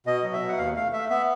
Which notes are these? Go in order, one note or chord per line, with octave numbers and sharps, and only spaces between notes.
B2 D#5
F#3
E5
B2
F#5
D#2 F5
A3 F5
A3 E5
B3 E5